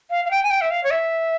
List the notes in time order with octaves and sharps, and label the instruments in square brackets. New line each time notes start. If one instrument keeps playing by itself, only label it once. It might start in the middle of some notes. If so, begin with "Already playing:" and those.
[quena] F5
F5
G5
G#5
G5
E5
F5
C#5
E5